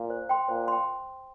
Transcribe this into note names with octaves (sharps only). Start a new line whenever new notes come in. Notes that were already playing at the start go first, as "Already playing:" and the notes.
Already playing: A#2
C5
G5 C6
A#2 C5
G5 C6